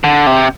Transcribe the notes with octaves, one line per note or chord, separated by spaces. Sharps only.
D3
C3